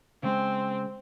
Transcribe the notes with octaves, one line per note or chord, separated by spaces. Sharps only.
C#3 G#3 C4